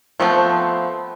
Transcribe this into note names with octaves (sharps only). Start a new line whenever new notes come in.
F3 A3 B3 C4